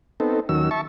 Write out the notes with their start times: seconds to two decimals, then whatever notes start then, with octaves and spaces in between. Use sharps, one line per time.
0.20 B3 C4 D#4 A4
0.49 D#2 D#3 F#3 C#4 E6
0.71 E5 A5 C#6